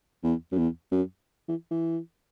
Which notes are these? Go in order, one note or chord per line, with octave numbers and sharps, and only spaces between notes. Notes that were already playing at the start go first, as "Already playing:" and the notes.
E2
F#2
E2
F#2
E3
E3